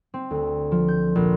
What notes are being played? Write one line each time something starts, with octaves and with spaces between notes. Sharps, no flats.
C4
D2
F3
G6
A#1